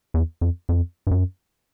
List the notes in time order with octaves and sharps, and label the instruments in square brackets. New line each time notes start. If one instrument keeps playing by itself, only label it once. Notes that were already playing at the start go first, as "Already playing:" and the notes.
[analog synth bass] E2
F2
F2
G2
F#2